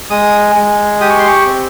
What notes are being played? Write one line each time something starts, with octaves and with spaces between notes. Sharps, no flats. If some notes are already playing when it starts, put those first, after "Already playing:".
G#3 D#6
G#3
G4 D#6
C#6
C6
C#6
C4